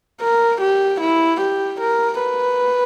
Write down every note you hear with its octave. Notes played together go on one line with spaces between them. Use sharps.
A#4
G4
E4
G4
A#4
B4